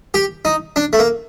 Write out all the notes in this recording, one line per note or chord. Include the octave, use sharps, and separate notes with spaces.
G4
D#4
D4
A3
A#3